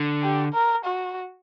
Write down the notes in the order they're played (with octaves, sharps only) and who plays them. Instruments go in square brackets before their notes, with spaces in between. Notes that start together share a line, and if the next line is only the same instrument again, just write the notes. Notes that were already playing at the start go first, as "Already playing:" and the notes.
Already playing: [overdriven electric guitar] D3
[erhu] G4
A#4
F#4